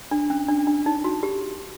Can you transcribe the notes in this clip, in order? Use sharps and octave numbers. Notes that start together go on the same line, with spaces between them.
D4
C#4
D4
D4
D#4
F#4
G4